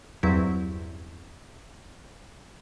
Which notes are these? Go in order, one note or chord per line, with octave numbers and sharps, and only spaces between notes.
E2 G2 F#3 C4 E4